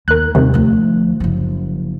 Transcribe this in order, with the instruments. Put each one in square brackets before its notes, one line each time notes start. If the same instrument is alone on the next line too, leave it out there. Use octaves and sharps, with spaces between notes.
[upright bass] D#2 [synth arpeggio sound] A#4 F#6
[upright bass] D#2 G3 [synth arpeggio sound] C3 D#3
[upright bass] D2 F3
F#1 F3